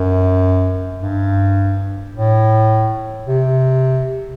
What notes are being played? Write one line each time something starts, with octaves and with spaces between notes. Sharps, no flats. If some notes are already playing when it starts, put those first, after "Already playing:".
Already playing: F#2
G2
A2
C3